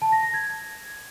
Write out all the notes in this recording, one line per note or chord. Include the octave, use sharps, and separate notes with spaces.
A5
A#6
A#6
G#6